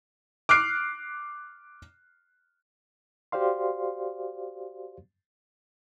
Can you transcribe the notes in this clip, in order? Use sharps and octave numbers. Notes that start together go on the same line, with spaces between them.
D6 F6 F#6 C7 D7
F#4 G4 C5 D5 F5 C6